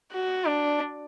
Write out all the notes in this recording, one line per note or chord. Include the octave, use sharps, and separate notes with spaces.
F#4
D4